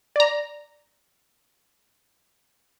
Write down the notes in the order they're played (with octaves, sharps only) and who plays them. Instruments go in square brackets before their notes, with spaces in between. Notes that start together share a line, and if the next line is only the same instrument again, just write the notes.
[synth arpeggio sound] D5 A#5